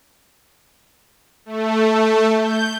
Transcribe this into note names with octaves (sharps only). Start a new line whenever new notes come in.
A3
G6